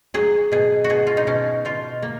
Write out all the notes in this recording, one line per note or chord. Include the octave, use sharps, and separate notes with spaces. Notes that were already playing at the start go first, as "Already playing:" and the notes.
F#3 G#4
B2 G#4
F#4
B2 G#4
F4
D#4
B2 C#4
B2 F4
A#3